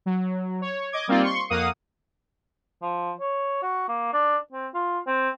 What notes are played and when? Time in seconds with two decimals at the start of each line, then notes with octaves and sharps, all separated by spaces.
0.06 F#3
0.61 C#5
0.92 D#5 D6 G#6
1.08 G3 A#3 C4 D#4 F4 D5
1.23 C6 C#6 C#7
1.50 F2 A#3 F5 F#5 D#6 D#7
2.82 F3
3.20 C#5
3.62 F#4
3.88 A#3
4.13 D4
4.53 C4
4.74 F4
5.07 C4